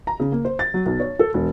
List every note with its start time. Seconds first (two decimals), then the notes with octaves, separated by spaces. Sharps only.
0.07 A#5
0.20 C#3
0.32 A#3
0.45 C5
0.59 A6
0.74 F#3
0.86 B1
1.00 C#5
1.19 A4
1.34 E1